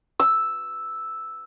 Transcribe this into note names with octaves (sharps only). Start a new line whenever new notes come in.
E6